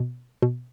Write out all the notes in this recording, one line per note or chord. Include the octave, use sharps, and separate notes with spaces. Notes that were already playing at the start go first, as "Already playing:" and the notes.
Already playing: B2
B2